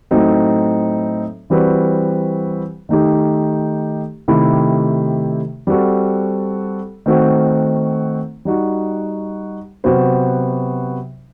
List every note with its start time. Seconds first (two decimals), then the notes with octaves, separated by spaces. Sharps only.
0.11 A2 F#3 C4 D#4 A4
1.50 E3 G3 C4 F#4 B4
2.89 D#3 A3 D#4 G4
4.28 C3 D#3 A3 E4 G4
5.67 G3 C4 F#4 A4
7.06 D#3 A3 C4 F#4 C5
8.45 G3 D#4 F#4
9.84 C3 F#3 B3 F#4 C5